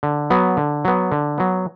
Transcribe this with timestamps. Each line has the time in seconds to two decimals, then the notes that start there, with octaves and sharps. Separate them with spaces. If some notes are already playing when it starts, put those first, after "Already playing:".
0.03 D3
0.30 F#3 B3
0.57 D3
0.85 F#3 B3
1.12 D3
1.38 F#3 B3